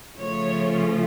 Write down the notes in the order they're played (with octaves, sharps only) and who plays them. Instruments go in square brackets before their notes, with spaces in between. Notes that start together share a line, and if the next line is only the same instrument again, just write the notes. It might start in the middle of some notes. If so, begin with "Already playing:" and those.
[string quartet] C#3 F3 A3 C#5